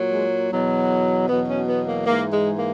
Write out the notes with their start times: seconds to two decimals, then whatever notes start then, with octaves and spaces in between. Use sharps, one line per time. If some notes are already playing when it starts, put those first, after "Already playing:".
Already playing: A#2 F#3
0.12 G#3
0.51 E2 B2 F#3
1.29 E2 B2 F#3 B3
1.49 C#4
1.68 B3
1.87 A#3
2.06 G#2 E3 A#3
2.32 G#3
2.58 A#3